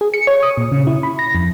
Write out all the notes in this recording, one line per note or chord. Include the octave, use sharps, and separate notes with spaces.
G#4
C#7
C#5
D#6
A#2
C#3
E4
B5
A#6
F2